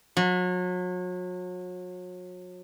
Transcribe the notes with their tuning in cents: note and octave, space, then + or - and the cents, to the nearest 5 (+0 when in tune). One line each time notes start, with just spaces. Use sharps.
F#3 -35